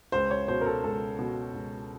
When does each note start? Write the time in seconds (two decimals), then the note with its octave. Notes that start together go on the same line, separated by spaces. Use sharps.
0.12 C#2 C5
0.31 C#5
0.48 B2 C5
0.61 A#4
0.66 A4
0.84 C#2 A4
1.19 B2
1.54 C#2